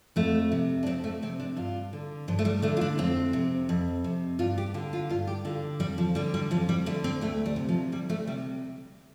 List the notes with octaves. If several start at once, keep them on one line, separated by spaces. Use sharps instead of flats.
F2 A3
C3
D4
F2 C4
A3
C3 C4
D4
G2 F4
D3
G2 F3
A3
G3
D3 A3
F4
D4
F2 C4
C3
F2
C3
G2 F4
G4
D3 F4
F4
G2 F4
G4
D3 F4
F2 G3
F3
D3 G3
G3
F2 F3
G3
D3 A3
C4
D2 A3
G3
C3
F3
D2 G3
A3
C3 G3